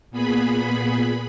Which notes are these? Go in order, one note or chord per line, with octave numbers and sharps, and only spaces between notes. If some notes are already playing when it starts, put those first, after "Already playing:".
A#2 B3 G#4 B5